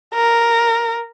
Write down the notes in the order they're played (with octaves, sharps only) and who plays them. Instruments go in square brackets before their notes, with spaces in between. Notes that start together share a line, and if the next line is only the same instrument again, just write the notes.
[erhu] A#4